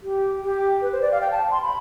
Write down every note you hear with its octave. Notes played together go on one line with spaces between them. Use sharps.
G4
G4
B4
C5
D5
F5
G5
A5
C6
B5